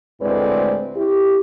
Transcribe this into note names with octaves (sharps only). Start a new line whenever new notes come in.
D2 A2 G#3 C4 B4 D5
E4 G4